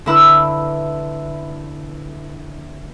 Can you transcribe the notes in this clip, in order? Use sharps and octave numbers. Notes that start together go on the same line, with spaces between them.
D3 E4 B4 E6